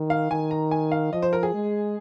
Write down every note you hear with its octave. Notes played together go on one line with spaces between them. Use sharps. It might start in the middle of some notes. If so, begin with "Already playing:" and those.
Already playing: D#3
F5
D#3 G#5
A#5
G#5
F5
F3 D#5
C5
A#4
G#4
G#3